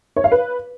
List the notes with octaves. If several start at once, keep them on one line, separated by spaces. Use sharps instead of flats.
C#5
F5
B4